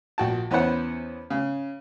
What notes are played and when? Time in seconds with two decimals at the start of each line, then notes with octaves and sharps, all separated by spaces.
0.18 A#1 F#4 G5 A5
0.51 E2 B3 C#4 E4 C5 F#5
1.30 C#3